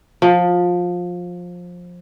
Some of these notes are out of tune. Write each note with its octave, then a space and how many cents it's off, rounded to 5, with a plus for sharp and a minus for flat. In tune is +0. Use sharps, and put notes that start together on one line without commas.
F3 +20